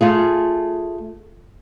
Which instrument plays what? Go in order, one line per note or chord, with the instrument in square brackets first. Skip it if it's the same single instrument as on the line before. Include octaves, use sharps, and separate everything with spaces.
[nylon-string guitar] A3 F4 G#4